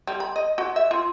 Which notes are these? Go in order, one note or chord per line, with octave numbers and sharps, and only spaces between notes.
G3
B5
D#5
F#4
E5
F4